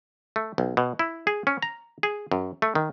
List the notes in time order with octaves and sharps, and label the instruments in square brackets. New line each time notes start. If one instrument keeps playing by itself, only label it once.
[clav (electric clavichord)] A3
B1
B2
E4
G#4
C#4
A#5
G#4
F#2
A3
D#3